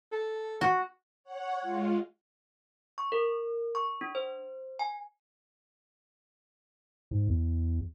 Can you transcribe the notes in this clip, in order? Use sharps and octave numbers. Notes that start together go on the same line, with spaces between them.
A4
F#4
C#5 F#5
G#3 F4
C#6
A#4
C#6
D4
C5
G#5
G#2
E2